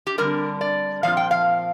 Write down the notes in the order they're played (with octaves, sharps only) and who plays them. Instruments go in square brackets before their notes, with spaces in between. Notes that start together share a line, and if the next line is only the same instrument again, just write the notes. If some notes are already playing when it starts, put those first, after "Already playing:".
[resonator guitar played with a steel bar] G4
D3 G3 C4 A#4
D5
A#2 F3 C4 F4 F5
G5
F5